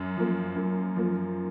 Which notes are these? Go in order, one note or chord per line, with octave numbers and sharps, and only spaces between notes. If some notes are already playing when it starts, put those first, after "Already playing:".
Already playing: F#2
F3 A#3
F#2
F3 A#3